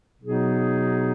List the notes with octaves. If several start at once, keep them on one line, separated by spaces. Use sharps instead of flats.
B2 F#3 B3 D#4 G#4